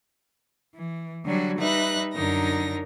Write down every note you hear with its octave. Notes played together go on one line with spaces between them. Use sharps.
E3
D3 F#3 G3 F#4
G3 D#4 B4 E5 F#6 A#6
F#2 D3 D#4 A#4 A#6